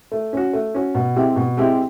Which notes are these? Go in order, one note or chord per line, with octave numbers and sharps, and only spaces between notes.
A3
C#4 F#4
A3
C#4 F#4
B2
G#3 C4 E4 G4
B2
G#3 C4 E4 G4